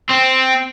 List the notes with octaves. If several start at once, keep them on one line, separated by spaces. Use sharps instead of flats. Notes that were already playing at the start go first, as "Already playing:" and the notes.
C4